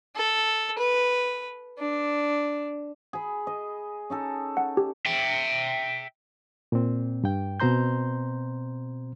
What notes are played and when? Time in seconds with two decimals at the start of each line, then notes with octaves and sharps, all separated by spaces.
0.16 A4
0.78 B4
1.78 D4
3.13 G#4 B5
3.47 D#5
4.10 C#4 D#4 A4
4.57 F#5
4.77 G4
5.06 E5 G5
6.72 A#2 C4
7.24 G2 G5
7.60 B2 C4 C5 A#5 C6 G6